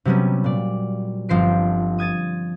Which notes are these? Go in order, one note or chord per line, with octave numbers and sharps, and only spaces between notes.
C3 F#3 G3 B3 C#4
A#2 D5
G1 F3 C4 C7 D7
D#6 G#6 A6 D#7